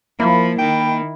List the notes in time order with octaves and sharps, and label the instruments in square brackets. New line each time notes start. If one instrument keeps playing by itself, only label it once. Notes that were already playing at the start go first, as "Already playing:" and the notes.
[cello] F3 [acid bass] A#3 [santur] E4
[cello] D#3 [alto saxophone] G5